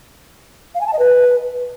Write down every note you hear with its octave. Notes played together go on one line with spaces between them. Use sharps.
F5
G#5
A5
D#5
B4